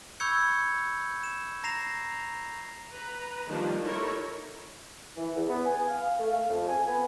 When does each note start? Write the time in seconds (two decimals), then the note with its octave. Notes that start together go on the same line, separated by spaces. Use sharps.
0.20 B5 C#6 E6 G6 G#6 C#7
1.23 E7
1.64 A#5 A#6 C7 E7 F7
2.92 B4 A#5
3.47 D#3 F3 G3 A#3 D4
3.83 D#4 E4 A4 A#4 C#5
5.17 E3
5.35 E2
5.49 B3
5.66 G#5
5.88 F5
6.19 A3
6.32 F5
6.50 F2
6.67 G#5
6.87 B3